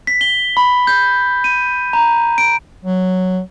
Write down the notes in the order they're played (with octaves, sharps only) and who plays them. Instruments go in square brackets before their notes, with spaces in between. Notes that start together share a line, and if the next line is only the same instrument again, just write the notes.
[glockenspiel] B6
G7
B5
G6
D#7
A#5
D7
[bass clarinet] F#3